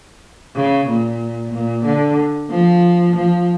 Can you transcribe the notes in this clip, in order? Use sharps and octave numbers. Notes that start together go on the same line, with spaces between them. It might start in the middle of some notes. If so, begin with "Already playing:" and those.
C#3
A#2
A#2
D3
F3
F3